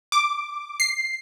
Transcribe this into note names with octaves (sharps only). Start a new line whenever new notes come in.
D6
C7